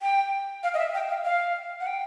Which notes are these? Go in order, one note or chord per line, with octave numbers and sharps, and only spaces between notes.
G5
F5
D#5
E5
G5
F5
F5
F#5
G5